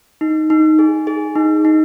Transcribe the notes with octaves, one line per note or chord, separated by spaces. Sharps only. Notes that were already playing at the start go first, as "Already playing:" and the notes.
D#4
D#4
G#4
G#4
D#4
D#4